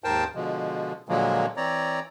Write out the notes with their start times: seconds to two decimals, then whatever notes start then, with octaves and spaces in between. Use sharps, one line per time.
0.04 D#2 G#2 A#4 C5 G5 A5
0.35 B2 D3 F3 G#3
1.09 A#2 D3 F3 F#3 G#3 A#3
1.57 E3 C4 C#5 D5 A#5